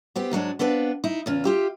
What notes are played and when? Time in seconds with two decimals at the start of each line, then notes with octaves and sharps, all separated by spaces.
0.16 B3 C4 G4
0.31 G#2 F#3 G#3 D4
0.59 B3 C4 D4 B4 F5
1.04 D#4 E4
1.26 E2 C#3 F4
1.44 F4 G4 E5